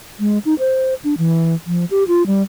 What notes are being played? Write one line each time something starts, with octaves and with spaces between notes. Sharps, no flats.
G#3
D#4
C5
D4
E3
F3
G4
F4
G3